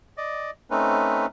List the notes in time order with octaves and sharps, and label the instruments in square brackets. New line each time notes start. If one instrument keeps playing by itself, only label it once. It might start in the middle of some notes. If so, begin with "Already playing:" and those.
[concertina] D5 D#5
A3 C4 C#4 D#4 B4